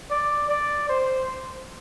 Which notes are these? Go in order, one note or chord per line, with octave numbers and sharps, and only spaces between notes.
D5
D5
C5